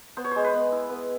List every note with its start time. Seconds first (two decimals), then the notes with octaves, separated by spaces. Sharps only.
0.17 B3 C5
0.24 C#5
0.31 G#3 C5
0.44 B4
0.54 B3
0.72 E4
0.89 B3